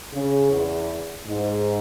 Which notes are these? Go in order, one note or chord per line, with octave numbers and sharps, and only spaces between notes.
C#3
E2
G#2